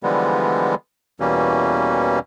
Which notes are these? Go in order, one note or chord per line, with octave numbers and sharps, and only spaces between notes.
D3 E3 F3 G3 G#3 B3
E2 B2 E3 G3 A#3 C#4